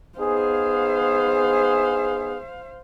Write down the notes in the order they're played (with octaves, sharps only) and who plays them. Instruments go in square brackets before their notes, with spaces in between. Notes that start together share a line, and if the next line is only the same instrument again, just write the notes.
[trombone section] B3 D#4 G#4 [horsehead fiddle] C5 F5